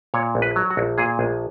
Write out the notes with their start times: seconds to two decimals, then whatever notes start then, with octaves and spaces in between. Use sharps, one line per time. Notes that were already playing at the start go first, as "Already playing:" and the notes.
0.14 A#2 C#5
0.35 A#1
0.42 B4
0.56 F#3
0.70 F#4
0.77 A#1
0.98 A#2 G#4
1.19 A#1